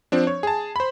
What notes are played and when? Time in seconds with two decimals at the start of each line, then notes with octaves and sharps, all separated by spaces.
0.12 F3 C4 D4
0.27 C#5
0.43 G#4 A5
0.76 C5 B5